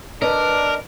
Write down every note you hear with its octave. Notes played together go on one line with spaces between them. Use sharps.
D4 A#4 B4 D5 D#5